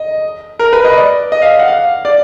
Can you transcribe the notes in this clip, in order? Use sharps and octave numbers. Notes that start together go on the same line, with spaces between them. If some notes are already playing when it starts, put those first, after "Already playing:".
Already playing: D#5
A#4
B4
D#5
D5
D#5
F5
F#5
F5
D5